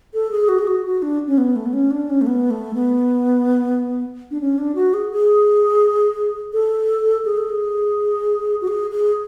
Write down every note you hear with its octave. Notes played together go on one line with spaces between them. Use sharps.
A4
G#4
F#4
G#4
F#4
F#4
D4
C#4
B3
A3
B3
C#4
D4
C#4
A3
B3
A3
B3
D4
C#4
D4
F#4
G#4
G#4
A4
G#4
A4
G#4
F#4
G#4
G#4